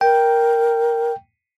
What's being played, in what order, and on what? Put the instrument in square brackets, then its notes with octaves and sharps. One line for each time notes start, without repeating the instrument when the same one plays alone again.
[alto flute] A#4 [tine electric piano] G5